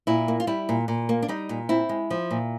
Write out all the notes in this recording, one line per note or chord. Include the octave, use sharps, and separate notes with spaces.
A#2 E4
A#3
F4
G3 E4
A#2
A#2
A#3
D4
G3 D#4
A#2
C4 E4
G#3
F3
A#2